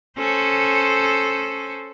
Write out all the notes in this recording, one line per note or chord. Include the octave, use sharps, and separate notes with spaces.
C#4 A4 C5